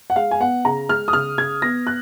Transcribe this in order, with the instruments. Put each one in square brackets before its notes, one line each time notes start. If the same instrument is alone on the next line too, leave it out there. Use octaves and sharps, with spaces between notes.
[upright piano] F#5
G#3 F5
G#5
B3 F#5
C#3 A#5
G#3 F6
D#6
C#3 F6
C#3 G#6
B3 A#6
F#6